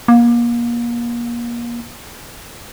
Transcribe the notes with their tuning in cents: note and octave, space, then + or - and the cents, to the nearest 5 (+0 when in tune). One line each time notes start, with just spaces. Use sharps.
A#3 +30